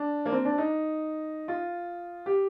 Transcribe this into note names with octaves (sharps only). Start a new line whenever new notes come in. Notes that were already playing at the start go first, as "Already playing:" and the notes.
Already playing: D4
A#3
C4
D4
D#4
F4
G4